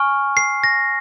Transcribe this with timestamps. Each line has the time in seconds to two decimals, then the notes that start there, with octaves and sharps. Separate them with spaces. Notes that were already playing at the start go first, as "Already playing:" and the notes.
Already playing: G#5 C#6 F6
0.37 C7
0.64 A#6